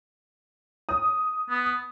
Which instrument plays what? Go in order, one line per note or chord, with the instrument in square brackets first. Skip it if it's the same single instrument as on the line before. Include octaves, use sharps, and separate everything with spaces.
[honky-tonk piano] D#6
[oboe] B3